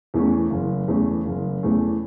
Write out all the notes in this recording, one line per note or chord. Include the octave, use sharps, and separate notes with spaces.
E2 E3 A3 C#4
F#1
E2 E3 A3 C#4
F#1
E2 E3 A3 C#4